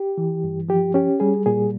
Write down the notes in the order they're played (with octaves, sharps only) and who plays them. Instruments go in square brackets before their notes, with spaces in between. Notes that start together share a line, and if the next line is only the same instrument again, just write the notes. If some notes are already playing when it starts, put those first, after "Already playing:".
Already playing: [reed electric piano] G4
E3
G2
F3 G4
C#4 G4
G3 G#4
A#2 G#4